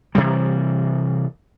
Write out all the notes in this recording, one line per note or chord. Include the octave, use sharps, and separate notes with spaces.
C3 E3 G3